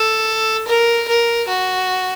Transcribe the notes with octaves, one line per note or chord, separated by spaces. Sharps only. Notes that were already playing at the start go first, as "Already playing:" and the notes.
Already playing: A4
A#4
A#4
F#4